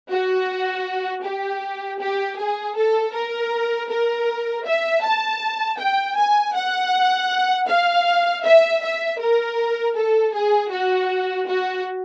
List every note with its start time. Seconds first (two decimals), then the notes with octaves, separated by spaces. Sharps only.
0.11 F#4
1.24 G4
2.01 G4
2.39 G#4
2.76 A4
3.14 A#4
3.89 A#4
4.66 E5
5.03 A5
5.79 G5
6.17 G#5
6.55 F#5
7.68 F5
8.44 E5
8.83 E5
9.20 A#4
9.95 A4
10.33 G#4
10.72 F#4
11.48 F#4